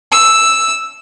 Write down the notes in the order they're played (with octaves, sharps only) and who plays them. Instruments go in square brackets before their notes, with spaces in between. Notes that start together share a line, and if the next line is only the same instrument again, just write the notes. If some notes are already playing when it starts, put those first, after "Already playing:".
[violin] E6